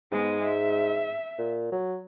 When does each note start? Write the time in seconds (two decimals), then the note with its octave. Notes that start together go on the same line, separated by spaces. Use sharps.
0.12 G#2 G#3 B3
0.42 E5
1.38 A#2
1.72 F#3